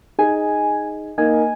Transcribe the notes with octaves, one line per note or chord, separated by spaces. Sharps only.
D#4 G#4 G#5
A#3 D#4 G#5